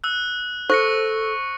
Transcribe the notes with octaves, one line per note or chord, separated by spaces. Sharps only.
E6 F#6
A4 C5 C#6 A#6 C#7